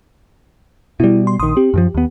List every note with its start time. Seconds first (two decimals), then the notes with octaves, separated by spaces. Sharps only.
1.00 B2 G3 E4
1.27 C6
1.40 A#1 D#3 C6 D#6
1.57 C4 G4
1.74 F#2 E3 F3
1.95 D#2 B3